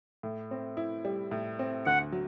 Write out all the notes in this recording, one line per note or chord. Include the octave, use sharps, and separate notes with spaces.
A2
C4
E4
G3
A2
C4
D2 F#5
F#3